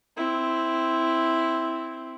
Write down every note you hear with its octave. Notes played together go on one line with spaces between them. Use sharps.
C4 E4